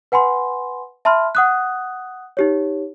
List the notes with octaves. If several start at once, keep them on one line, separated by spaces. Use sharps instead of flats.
B4 F#5 G#5 B5 C6
E5 A5 B5 C6 F6
F#5 D#6 F#6
D#4 G4 C#5